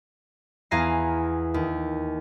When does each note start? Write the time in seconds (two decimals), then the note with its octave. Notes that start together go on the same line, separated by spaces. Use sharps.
0.71 E2 F5 G#5 A#5 A#6 C7
1.54 D#2